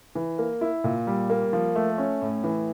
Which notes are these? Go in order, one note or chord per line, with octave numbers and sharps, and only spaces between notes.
E3
A#3
E4
A#2
G3
A#3
F3
A3
C#4
A2
E3